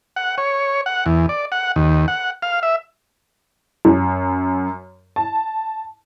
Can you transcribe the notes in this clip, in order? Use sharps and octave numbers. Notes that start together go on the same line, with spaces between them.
F#5
C#5
F#5
E2
D5
F#5
D#2
F#5
F5
E5
F#2
A5